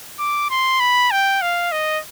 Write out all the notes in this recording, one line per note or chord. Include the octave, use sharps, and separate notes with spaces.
D6
C6
B5
G5
F5
D#5